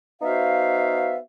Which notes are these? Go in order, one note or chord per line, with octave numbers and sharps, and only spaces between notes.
B3 D#4 F#4 C5 E5 F5